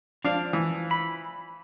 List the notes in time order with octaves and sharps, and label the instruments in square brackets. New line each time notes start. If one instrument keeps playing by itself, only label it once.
[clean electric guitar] F3 F5 [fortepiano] D4
[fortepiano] E3
[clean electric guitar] B5